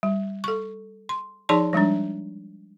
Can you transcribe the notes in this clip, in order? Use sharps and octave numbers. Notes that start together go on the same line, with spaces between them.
G3
A4 C#6
C6
F3 D#4 G#4 D5 A5 C6
F3 G3 G#3 D4